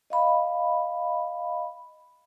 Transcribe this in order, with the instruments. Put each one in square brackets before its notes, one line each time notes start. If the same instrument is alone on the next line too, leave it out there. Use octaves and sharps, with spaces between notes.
[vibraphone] D#5 F5 B5